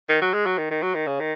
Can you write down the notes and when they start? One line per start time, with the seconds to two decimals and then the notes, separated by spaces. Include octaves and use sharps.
0.09 D#3
0.22 F#3
0.34 G#3
0.46 F#3
0.58 D#3
0.71 D#3
0.82 F#3
0.95 D#3
1.07 C#3
1.20 D#3